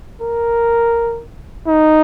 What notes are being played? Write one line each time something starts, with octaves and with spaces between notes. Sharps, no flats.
A#4
D#4